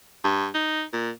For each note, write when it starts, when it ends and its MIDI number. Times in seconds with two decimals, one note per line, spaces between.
0.24 0.47 43
0.54 0.83 63
0.93 1.10 46